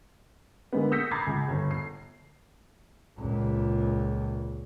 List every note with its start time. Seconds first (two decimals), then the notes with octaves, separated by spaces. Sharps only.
0.73 D3 G#3 A#3 B3
0.92 D#6 E6 G6 A#6 B6 C#7
1.11 A#5 B5 D6 G#6 A6 C7
1.27 C#2
1.49 G1
1.71 C7
3.19 C#2 A#2